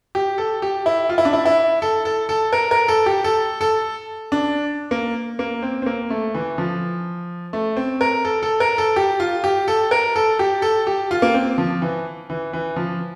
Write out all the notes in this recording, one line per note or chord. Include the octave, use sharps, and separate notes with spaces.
G4
A4
G4
E4
F4
E4
D4
E4
E4
A4
A4
A4
A#4
A#4
A4
G4
A4
A4
D4
A#3
A#3
C4
C4
A#3
A3
E3
F3
A3
C4
A#4
A4
A4
A#4
A4
G4
F4
G4
A4
A#4
A4
G4
A4
G4
F4
A#3
C4
F3
E3
E3
E3
F3